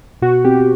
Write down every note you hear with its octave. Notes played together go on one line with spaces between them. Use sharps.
B2 F#4
C4 G4